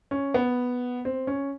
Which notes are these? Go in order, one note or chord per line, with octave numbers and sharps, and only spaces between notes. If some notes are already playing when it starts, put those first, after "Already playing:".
C#4
B3
C4
C#4